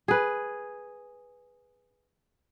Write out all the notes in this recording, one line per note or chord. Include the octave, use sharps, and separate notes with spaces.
G#4 B4